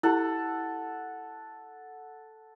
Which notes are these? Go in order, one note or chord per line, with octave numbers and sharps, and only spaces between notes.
E4 G4 A4 F#5